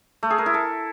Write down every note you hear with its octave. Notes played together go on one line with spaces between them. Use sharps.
A3
G#4
A#4
E4
A4